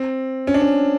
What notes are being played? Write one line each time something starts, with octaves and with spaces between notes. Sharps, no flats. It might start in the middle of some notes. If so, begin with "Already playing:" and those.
Already playing: C4
C#4
D4
C#4